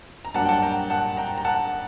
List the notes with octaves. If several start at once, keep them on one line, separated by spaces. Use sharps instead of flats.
A#5
G2 F#3 A#3 D4 F#5 A5
G5
F#5 A5
G5 A#5
F#5 A5
G5 A#5
A#5
F#5 A5